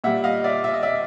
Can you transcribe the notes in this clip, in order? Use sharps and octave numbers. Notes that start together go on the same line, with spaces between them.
A#2 G3 E5 F#5
D#5 F5
D5 E5
E5
D#5
D5 E5